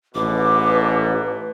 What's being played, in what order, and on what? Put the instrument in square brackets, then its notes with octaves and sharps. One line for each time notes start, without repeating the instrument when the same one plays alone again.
[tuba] A1 [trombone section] G#2 B2 [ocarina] B4 [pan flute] D6